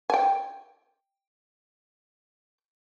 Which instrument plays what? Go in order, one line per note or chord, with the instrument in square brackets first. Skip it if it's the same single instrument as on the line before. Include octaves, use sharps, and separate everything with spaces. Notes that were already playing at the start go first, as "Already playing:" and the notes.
[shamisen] G5 G#5